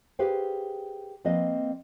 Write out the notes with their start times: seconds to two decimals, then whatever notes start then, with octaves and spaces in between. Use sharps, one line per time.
0.19 G4 G#4 B4 C5 F5 G5
1.25 F3 A#3 C4 B4 D#5